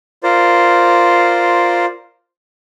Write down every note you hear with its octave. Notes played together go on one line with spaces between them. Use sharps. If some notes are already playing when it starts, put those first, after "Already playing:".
F4 A#4 C5 D5